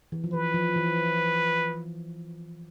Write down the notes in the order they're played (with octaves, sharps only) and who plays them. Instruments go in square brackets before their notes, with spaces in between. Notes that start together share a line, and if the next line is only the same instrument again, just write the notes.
[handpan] E3
F3
[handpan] E3 [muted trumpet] B4
[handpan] F3
E3